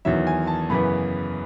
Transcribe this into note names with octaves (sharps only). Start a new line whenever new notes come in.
E2 D#3 F#3 E5
G#5
A5
F#2 C#3 E3 B3 B5